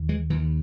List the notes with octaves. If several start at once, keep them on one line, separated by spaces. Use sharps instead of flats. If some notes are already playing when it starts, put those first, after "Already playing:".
Already playing: D#2
E3 G#3
D#2 E3